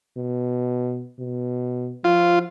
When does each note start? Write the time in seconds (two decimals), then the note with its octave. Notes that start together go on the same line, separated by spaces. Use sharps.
0.17 B2
1.19 B2
2.04 F3 F4